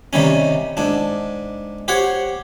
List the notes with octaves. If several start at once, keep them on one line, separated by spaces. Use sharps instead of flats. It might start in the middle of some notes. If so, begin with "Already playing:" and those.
C3 D#3 G3 C#4
G#2 D4
G4 C5 C#5 F#5